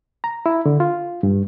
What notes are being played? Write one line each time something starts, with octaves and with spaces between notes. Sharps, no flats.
A#5
E4
D3
F4
G2